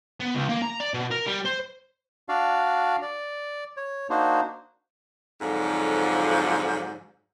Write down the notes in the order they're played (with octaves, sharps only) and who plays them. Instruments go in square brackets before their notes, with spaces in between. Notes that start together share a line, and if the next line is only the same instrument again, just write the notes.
[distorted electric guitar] B3
C#2
A#3
A#5
D5
B2
A#4
G3
C5
[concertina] D4 F#4 D5 F5
D5
C#5
A#3 D4 D#4 F#4 C5
[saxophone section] F2 G#2 D3 F3 F#3